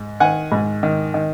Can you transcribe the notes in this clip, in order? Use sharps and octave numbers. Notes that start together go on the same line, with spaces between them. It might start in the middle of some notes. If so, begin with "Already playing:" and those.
Already playing: G#2
D#3 F#5 G#5
G#2
D#3
D#3